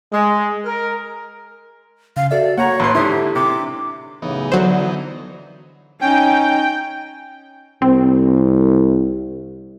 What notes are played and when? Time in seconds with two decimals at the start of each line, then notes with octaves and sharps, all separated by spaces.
0.12 G#3
0.65 A#4
2.17 C#3 F5
2.31 F#4 A4 D5 E5
2.58 A#3 C#5 F#5 A#5
2.80 A1 B4 C6
2.95 G#2 D3 D4 E4 G4 E5 C6
3.36 C3 D6
4.22 A1 F#2 C#3 E3 B3 D#4
4.52 D3 F#3 C5
6.01 C#4 D#4 G5
7.82 C2 C4